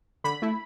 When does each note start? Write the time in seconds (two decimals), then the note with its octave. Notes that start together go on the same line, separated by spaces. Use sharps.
0.24 D3 B5
0.42 A3 E4